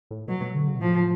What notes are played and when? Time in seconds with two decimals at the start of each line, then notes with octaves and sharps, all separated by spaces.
0.11 A2
0.28 B2 F#3
0.41 B2
0.55 D3
0.67 C#3
0.76 B2
0.80 A2 F3